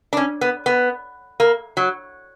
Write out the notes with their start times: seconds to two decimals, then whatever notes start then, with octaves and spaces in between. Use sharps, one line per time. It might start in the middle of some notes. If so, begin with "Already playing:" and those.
0.13 D4
0.17 C#4
0.41 B3
0.66 B3
1.40 A#3
1.77 F#3